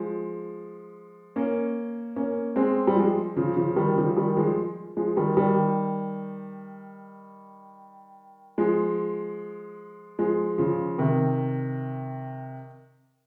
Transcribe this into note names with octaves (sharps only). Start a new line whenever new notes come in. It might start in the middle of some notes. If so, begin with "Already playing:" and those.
Already playing: F3 G#3
A#3 C#4
A#3 C#4
G#3 C4
G3
F3 G#3
C#3 F3
C#3 F3
D#3 G3
C#3 F3
D#3 G3
F3 G#3
F3 G#3
D#3 G3
D#3 G3
F3 G#3
F3 G#3
C#3 F3
C3 D#3